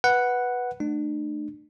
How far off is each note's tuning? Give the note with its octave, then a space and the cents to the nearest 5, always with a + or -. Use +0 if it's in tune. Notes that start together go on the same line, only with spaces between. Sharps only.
B4 -5 F#5 +0
A3 +0 D4 +35